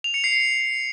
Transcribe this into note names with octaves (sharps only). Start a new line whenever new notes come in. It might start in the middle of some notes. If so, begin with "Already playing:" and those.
F7
C#7
C7